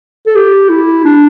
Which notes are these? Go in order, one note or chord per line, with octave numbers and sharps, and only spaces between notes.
A4
G4
E4
D4